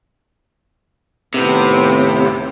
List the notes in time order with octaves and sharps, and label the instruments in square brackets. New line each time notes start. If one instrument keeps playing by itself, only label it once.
[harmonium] D#2 A2 B3 [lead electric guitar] C3